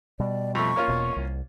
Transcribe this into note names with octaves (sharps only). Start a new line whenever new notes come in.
B2 G3 D5
F2 A3 C#6
A#3 C#4 F4
E1 B2
C2